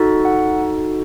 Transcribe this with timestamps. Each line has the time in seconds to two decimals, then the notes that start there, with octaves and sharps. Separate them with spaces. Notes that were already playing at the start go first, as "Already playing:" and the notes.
Already playing: D#4 F#4 A4
0.25 F#5